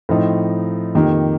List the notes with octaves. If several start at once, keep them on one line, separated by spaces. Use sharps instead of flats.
A2 F3 C4 D#4
F2 D#3 A#3 D#4 G4